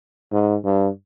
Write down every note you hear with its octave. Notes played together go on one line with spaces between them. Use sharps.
G#2
G2